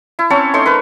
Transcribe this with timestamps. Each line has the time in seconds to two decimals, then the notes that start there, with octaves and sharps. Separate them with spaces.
0.19 E4
0.30 C4 C#4 C#5 A5
0.54 A3 D#4 C#5 C6
0.66 A#4 B4